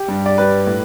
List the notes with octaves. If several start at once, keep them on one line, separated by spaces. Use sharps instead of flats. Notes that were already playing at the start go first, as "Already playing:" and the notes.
Already playing: G4
G2 G3
D5
G2 G3 B4
A2